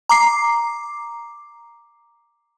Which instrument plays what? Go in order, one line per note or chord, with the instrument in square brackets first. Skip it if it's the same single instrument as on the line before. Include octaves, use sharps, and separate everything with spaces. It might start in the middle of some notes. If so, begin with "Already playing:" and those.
[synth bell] A#5 D6 C7